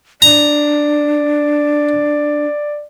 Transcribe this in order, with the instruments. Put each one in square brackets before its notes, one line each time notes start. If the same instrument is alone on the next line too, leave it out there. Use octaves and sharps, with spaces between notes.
[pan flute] D4 [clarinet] D5 [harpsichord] A#5